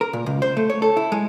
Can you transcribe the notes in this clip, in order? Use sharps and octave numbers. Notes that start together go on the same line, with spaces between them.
A#4
A#2
C#2
C5
A3
C#5
A4
E4
G#3